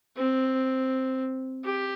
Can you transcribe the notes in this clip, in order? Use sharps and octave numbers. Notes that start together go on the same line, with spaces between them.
C4
G4